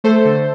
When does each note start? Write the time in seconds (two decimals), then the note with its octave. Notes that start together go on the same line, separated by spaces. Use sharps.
0.04 A3 A4 C5
0.25 D3